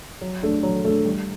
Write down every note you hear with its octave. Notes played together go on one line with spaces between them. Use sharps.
F#3
A3 D4 A4
F#3
A3 D4 A4
G3